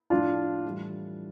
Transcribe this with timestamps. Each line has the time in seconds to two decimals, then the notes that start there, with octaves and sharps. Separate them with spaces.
0.10 A2 F3 D4 F4
0.64 A2 E3 G3